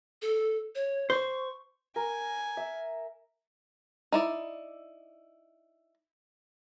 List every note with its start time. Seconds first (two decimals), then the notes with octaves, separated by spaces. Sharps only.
0.22 A4
0.75 C#5
1.10 C5 C#6
1.96 A#4 G#5
2.57 E5
4.12 D#4 E4 D5